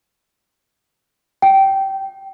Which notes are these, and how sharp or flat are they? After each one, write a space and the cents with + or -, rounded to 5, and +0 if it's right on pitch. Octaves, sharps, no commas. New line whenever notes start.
G5 -15